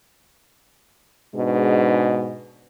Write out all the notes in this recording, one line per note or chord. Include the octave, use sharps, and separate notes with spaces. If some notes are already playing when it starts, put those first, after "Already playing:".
G#2 B2 G#3 D4